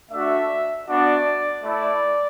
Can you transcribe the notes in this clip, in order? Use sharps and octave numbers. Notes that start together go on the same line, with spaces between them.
A3 D4 F#4 E5
B3 D4 F#4 D5
A3 E4 D5